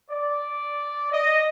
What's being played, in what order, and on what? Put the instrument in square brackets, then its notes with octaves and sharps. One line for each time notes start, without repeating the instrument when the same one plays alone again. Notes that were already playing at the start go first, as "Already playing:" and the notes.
[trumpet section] D5
D#5